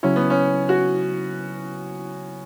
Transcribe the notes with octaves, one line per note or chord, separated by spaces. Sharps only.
C#3 F#3 C#4 E4
B3
C#4
F#4